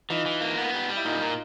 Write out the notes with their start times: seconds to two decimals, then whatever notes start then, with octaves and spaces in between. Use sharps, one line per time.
0.10 E3 D#4 F4
0.26 E3
0.41 A#3
0.57 B3
0.74 G3
0.89 G3
0.97 E4
1.05 A#2 D#4 F4
1.21 A#2